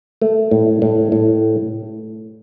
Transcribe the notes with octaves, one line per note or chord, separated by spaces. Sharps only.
A3
A2
A2
A2